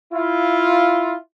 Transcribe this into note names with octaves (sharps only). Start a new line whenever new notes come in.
E4 F4